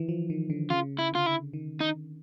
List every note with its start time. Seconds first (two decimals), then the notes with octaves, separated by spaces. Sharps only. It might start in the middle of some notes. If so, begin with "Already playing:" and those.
Already playing: D#3 E3
0.09 F3
0.30 D#3
0.50 D3
0.70 C#3 F4
0.99 E4
1.13 D3 F4
1.26 E4
1.53 D#3
1.80 D#4